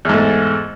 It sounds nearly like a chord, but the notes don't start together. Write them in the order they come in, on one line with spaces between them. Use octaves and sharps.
E2 G#2 A3